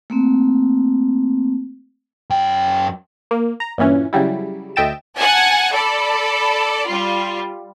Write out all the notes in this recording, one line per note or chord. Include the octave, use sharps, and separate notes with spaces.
A3 A#3 C4
F#2 G5
A#3
A#5
G2 A#2 E3 C#4
C#3 F#3 G3 E4
D2 D#5 E5 G5 A6 E7
F#5 G#5 A5
A4 D5 B5
G3 F4